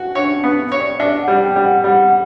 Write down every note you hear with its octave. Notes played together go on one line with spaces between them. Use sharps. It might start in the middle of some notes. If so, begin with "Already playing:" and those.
Already playing: F#4
D4 C#5
D4
B3
C#5
D5
D4 D5
F#5
G3
G5
G3
F#5
G3 F#5